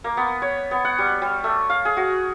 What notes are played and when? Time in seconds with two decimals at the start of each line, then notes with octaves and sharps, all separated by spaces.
0.04 A#3
0.17 B3
0.42 C#5
0.71 B3
0.85 F#5
0.98 G3
1.22 G3
1.44 A3
1.70 F5
1.85 G#4
1.97 F#4